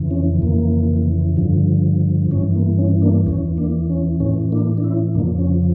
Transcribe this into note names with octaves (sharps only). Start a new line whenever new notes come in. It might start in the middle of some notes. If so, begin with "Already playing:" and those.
Already playing: F2 C#3 E3
C#4
F2 C#3 E3 A#3
G2 D3 F3
G2 E3 C#4
A#3
C#4
A#3 D4
E2 E3 C#4
A#3 D4
C#4
A2 E3 C#4
A#3 D4
D4
C#4 E4
F2 C#3 F3 A#3 D4
C#4